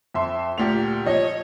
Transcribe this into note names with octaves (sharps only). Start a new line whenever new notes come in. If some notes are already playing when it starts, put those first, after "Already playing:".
F2 E5 C6
D2 A#2 G4 F7
F3 C#5 D#5